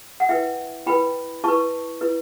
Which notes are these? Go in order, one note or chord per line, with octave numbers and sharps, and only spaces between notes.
F#5
E4 B4 E5 G5
E4 B4 G5 B5
E4 B4 A5 C#6
E4 B4